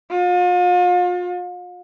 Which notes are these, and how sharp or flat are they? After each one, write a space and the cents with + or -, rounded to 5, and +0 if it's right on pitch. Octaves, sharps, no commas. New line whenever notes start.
F4 +40